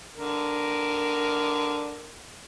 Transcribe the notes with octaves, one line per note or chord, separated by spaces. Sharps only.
D3 A#4